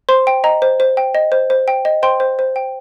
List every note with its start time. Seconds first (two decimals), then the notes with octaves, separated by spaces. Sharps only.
0.09 C5 C6
0.27 G5
0.44 D#5 A#5
0.62 C5
0.80 C5
0.97 G5
1.15 D#5
1.32 C5
1.50 C5
1.68 G5
1.85 D#5
2.03 C5 G5 C6
2.20 C5
2.39 C5
2.56 G5